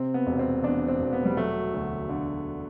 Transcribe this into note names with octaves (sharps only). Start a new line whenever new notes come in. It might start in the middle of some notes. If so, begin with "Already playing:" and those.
Already playing: C3 C4
B3
E1
C4
E2 D4
C4
E1
B3
G3
F#3 A3
D2
D3